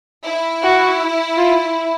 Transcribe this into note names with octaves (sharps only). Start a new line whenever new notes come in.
E4
F#4
F4